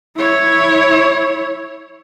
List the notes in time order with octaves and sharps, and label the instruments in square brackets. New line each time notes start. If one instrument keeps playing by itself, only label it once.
[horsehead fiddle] E4 C#5